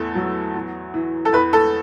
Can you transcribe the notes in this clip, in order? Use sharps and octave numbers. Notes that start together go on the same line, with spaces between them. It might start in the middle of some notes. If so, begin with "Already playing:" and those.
Already playing: E2 A2 B3 A4
F#3
E2
E3
A4
E2 B4
A4